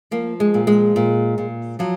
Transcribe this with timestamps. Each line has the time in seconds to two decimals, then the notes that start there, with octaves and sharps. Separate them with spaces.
0.11 F3 A#3
0.40 G#3
0.54 A#2
0.67 G#3
0.96 A#2
1.38 A#2
1.79 F3 F#3